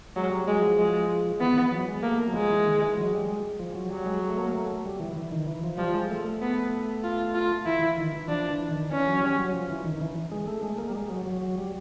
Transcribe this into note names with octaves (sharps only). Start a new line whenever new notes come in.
F#3 G#3
G3
F#3 G#3
F3
G#3
E3 B3
E3
F#3
G#3
A3 A#3
A#3
F#3
F3 G#3
E3
D#3
E3
F#3
G3
G#3
F3
F#3
F#3 G3
G#3
A3
A#3
A3
G3
E3
E3
D#3
E3
F3
F3 G3
G#3
A3
A3
B3
F4
F4
E3 E4
E3
D#3
E3
F3 D4
E3
D#3
E3 C#4
F#3
G3
F#3
F3
E3
D#3
D#3
E3
G#3
A3
G#3
A#3
G3
G#3
F#3
F#3
F#3
G3